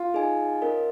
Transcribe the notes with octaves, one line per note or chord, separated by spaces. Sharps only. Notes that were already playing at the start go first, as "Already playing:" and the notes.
Already playing: F4
D#4 G#4 D#5 G#5
C#4 A#4 D#5